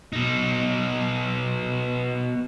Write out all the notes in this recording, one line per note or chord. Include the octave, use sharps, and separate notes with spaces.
B2 D#4